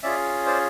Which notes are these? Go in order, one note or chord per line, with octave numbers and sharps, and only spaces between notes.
C#4 F4 G#4 D5 E5
C5 D5